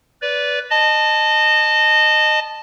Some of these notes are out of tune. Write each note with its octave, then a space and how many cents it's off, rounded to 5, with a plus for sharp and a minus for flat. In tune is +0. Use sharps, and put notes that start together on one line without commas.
B4 +0 D5 -20
D#5 -20 A5 +0